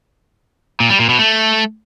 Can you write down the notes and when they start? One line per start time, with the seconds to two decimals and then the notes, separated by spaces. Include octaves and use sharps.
0.80 A#2
0.90 G3
1.00 A#2
1.09 B2
1.19 A3